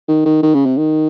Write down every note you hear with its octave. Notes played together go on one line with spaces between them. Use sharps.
D#3
D#3
D#3
C#3
C3
D#3